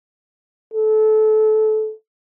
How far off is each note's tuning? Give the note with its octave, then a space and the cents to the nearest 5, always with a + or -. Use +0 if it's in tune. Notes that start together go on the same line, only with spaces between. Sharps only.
A4 -25